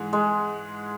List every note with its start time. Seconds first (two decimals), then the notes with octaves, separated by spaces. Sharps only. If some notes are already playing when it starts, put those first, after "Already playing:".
Already playing: G#2 E3 G#4
0.13 G#3